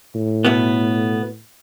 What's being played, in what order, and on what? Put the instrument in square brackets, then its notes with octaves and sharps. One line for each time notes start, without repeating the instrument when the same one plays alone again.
[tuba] A2
[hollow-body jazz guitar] B2 A3 B3